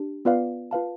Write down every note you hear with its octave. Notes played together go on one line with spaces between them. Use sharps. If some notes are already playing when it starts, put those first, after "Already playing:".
Already playing: D4 G4
B3 F4 B4 D5 F5
F4 B4 F5 A5